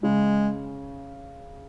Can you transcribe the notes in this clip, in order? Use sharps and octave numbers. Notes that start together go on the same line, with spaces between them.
C#3 G#3